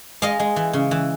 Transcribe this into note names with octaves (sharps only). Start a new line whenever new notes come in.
G#3 D#5 F5
G#3
E3
C#3
E3